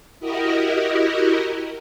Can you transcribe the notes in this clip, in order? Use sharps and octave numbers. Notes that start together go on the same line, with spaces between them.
E4 F#4 G4 A#4 D#5